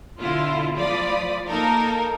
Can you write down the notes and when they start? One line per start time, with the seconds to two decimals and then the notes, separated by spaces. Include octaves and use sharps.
0.18 B2 D3 E4 F4
0.76 F3 A3 F4 D5 B5 D#6
1.48 A#3 D#4 A4 A#4